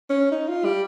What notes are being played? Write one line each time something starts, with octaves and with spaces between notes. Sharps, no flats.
C#4
D#4
F4
G3